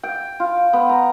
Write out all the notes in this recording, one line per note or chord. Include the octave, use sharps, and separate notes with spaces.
G5
F4
B3
A#5